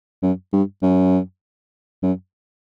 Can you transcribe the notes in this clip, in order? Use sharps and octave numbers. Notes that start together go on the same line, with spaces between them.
F#2
G2
F#2
F#2